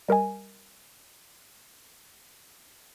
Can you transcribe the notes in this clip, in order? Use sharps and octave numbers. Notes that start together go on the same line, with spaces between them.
G3 A#4 D#5 G#5